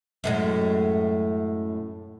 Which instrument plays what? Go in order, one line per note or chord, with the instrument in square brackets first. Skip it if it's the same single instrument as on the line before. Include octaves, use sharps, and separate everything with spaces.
[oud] F#2 A2 G#3